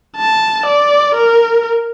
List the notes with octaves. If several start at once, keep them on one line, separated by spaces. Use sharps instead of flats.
A5
D5
A#4